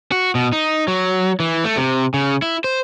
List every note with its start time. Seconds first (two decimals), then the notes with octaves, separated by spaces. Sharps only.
0.12 F#4
0.35 B2
0.52 D#4
0.88 F#3
1.40 E3
1.64 A3
1.77 C3
2.14 C#3
2.42 E4
2.64 C5